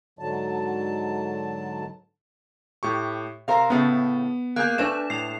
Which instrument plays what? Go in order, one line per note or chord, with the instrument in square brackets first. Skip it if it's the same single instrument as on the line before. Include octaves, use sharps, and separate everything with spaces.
[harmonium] G#2 D3 F#3 A5
[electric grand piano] A2 G4 C#6
[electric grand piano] C3 A#5 [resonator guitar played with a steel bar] A#4 C5 F5
[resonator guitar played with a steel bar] A2 C#3 A3 [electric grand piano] B3
[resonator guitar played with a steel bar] A#3 G#4 [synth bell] F#6 G6
[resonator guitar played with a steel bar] A3 D5 [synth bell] D4 B4 E7
[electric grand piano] A2 [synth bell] C7 F7